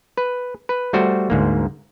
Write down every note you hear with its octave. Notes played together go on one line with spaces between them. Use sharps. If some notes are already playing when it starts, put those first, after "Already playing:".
B4
B4
G3 A3 F#4 C5
D2 G#2 A#3